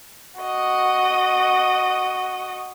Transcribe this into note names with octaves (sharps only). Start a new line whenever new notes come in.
F#4 D#5